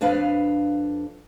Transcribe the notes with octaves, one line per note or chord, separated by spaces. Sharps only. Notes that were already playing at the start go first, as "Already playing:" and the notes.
F2 D4 B4 F5